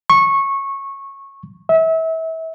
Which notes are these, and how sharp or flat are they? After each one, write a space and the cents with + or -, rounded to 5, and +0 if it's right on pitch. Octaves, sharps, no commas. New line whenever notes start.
C#6 -15
E5 -30